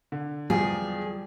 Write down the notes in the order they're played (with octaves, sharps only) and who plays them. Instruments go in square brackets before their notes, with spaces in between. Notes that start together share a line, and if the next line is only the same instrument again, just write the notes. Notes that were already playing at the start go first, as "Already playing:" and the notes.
[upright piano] D3
[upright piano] E2 F3 [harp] G3 [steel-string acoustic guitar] G#4